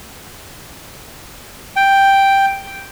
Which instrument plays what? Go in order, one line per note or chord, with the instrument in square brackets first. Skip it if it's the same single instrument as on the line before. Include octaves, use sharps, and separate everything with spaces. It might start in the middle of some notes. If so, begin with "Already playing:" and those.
[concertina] G5